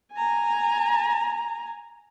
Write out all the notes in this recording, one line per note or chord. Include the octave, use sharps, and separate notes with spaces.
G#5 A#5